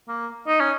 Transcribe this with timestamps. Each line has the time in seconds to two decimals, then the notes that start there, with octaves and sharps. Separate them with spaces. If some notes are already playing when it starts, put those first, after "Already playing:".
0.08 A#3
0.48 D#4
0.60 C#4